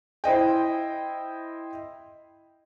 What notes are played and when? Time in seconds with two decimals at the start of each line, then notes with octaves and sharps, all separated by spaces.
0.24 E4 C5 D#5 G5